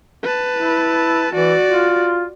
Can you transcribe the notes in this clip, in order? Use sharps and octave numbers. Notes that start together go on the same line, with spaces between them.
B4 A5
E4
E3 F#4 D5
F4